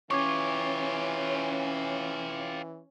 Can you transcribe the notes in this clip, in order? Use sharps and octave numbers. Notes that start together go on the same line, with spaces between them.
E3 C#4 F4 G4 C#6 D6 G#6